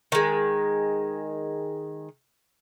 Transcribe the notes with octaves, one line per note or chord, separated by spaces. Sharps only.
D#3 G#3